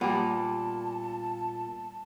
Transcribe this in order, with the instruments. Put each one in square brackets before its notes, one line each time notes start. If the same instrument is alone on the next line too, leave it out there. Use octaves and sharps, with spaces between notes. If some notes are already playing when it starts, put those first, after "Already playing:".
[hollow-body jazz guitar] A#2 [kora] G3 B3 [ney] A5